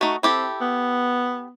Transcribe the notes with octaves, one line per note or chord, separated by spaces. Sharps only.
A3 D#4 F#4
C4 E4 G4 A4
B3